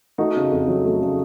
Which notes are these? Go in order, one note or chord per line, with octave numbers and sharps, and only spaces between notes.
A3 D#4 F#4
C#3
F2
F#3
A3
C#3